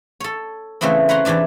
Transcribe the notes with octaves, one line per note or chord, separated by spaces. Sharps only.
A4 C#5
C#3 E3 A3 B3 C4
B4 C#5 F#5 A#5 C6
E2 C3 E3 D4 A5